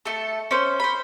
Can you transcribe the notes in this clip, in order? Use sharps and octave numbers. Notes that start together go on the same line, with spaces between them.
A3 A4
C#4 C5
C5 B5